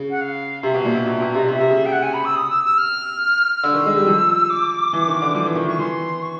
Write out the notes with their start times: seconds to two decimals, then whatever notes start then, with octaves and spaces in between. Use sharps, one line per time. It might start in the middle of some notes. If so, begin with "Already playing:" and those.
Already playing: C#3
0.10 F#5
0.21 F5
0.63 C3 E5
0.74 B2 F5
0.85 A#2 E5
0.95 B2
1.06 B2
1.20 B2
1.34 C3 D#5
1.49 C3 E5
1.60 C3
1.70 C#3
1.85 G5
1.92 F#5
2.03 G#5
2.14 B5
2.25 E6
2.35 D#6
2.50 E6
2.64 E6
2.78 F6
3.55 F6
3.63 D3 E6
3.74 D#3
3.86 G#3
3.96 G3
4.06 F3
4.50 D6
4.93 E3
5.07 D#3
5.22 D3
5.35 F3
5.46 E3
5.55 D#3
5.65 E3 C#6
5.79 E3 C6
6.22 C#6